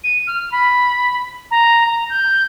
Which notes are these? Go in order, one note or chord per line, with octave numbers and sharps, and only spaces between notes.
D#7
F6
B5
A#5
A#5
G6